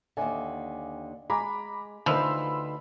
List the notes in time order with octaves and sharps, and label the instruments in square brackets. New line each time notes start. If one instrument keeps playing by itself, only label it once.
[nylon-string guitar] D#2 D3 [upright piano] E5 G#5
[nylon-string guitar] G#3 [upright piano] G#5 A#5 D6 [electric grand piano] B5
[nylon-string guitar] D2 D#4 B4 [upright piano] D3 [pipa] F3 [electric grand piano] B5 C6 E6